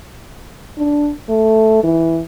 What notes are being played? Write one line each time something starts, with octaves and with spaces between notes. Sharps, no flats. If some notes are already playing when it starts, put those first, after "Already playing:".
D4
A3
E3